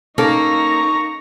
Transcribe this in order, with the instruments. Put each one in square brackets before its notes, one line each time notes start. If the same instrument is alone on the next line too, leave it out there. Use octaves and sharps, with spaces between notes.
[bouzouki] A#3 [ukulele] C#4 A4 [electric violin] D#4 A#5 [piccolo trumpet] C#6